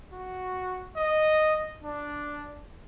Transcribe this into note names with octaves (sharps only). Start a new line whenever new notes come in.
F#4
D#5
D4